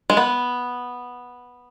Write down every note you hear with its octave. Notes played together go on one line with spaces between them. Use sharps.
G#3
B3